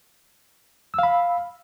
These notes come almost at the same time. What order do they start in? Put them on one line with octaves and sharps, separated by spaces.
E6 F5 B5